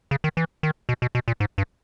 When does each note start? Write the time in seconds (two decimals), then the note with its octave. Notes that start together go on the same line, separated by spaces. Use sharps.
0.11 C#3
0.24 D#3
0.37 E3
0.63 D#3
0.89 B2
1.02 B2
1.15 B2
1.28 A#2
1.40 G#2
1.58 G2